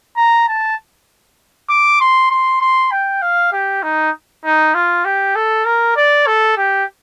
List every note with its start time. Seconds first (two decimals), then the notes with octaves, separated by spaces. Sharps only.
0.17 A#5
0.48 A5
1.69 D6
2.01 C6
2.31 C6
2.61 C6
2.91 G5
3.22 F5
3.53 G4
3.83 D#4
4.44 D#4
4.75 F4
5.05 G4
5.35 A4
5.65 A#4
5.96 D5
6.27 A4
6.57 G4